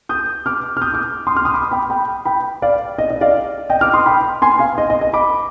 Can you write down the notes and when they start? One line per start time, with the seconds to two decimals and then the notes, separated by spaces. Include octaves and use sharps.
0.09 D#6 G6
0.46 D6 F6
0.77 F6
0.82 D#6 G6
0.94 D6 F6
1.27 C6 D#6
1.35 D6 F6
1.45 C6 D#6
1.54 B5 D6
1.71 G5 B5
1.90 G5 B5
2.25 G5 B5
2.62 D5 F5
2.98 D#5
3.10 D#5
3.21 D5 F5
3.70 D#5 G5
3.81 D6 F6
3.94 C6 D#6
4.06 G5 B5
4.42 G#5 C6
4.59 F5 G#5
4.78 D#5
4.90 D#5
5.01 D#5
5.13 B5 D6